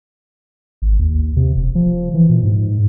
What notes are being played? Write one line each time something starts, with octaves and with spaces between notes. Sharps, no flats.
G#1
D#2
C3
E1
F3
E3
A#2
G#2